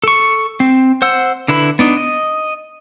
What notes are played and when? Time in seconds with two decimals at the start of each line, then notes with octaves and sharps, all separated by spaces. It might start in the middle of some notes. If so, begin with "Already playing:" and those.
0.04 A4 C#6
0.60 C4
1.02 C5 F#5 E6
1.48 D3 E4 B4 B5
1.79 B3 D4 D#4
1.97 D#5